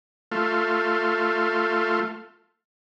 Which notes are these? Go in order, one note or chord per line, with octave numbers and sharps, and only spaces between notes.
A3 F4